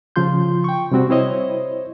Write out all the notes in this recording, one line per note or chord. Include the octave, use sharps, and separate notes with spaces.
C#3 F3 F4 C6 G6
G5 C#6
C3 G3 C4 F#4
E4 C5 C#5 D#5